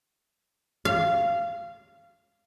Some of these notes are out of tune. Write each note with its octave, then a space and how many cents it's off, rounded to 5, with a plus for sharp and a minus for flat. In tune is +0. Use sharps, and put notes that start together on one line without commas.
F5 -20